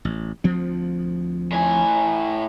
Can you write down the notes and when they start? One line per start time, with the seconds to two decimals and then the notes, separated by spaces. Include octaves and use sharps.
0.05 A1
0.44 D2 F3 C4
1.52 A2 G#5